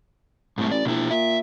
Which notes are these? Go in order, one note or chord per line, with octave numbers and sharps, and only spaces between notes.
C2 G#2 A3
A1 D5
A#1 B2 E4
A#2 E5